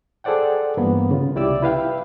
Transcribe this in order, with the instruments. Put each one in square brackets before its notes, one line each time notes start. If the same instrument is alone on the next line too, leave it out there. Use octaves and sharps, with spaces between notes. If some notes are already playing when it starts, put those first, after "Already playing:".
[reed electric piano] G#4 A4 C5 D5 F#5 G5
G2 E3 A#3 B3
C#3 F4
C2 E4 G4 D5 D6 E6
E4 B4 F5 G5